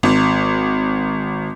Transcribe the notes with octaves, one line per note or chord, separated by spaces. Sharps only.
G#1